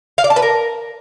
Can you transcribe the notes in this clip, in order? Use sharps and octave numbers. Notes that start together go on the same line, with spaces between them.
F5
D5
A5
B4
A#4